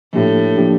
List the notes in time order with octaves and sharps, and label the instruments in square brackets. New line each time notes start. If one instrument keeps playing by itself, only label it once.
[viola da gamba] A2 [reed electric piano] F3 A#3 D4 G4
[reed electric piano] F3 A#3 D4 G4